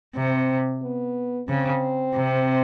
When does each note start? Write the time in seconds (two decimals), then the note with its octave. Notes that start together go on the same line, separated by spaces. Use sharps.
0.15 C3 C4
0.82 B3
1.48 C#3 C4
2.15 C3